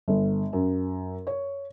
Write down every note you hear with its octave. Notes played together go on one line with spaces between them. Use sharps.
G1
F#2
C#5